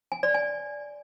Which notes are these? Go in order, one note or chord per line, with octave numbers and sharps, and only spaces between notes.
G#5
D5
G#5